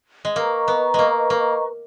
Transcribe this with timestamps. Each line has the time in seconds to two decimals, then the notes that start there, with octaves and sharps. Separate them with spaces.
0.25 G#3
0.36 A#3 B4 D#5 A#5 C#6
0.68 B3
0.94 G#3 A#3
1.30 A#3